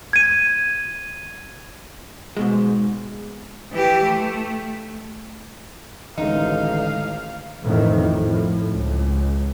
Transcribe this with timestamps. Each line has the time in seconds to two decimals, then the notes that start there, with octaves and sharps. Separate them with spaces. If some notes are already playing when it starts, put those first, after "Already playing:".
0.13 G#6 D#7
2.37 G#2 B2 G#3
3.73 E3 G4
4.04 A3
6.18 A1 D3 D#3 G#3 D#4 F5
7.63 A1 F2 A2 D#3 E3
8.22 A2 F3
8.67 C#2